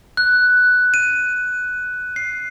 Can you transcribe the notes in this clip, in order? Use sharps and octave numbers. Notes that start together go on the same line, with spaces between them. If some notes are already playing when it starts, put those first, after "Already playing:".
F#6
D#7
C7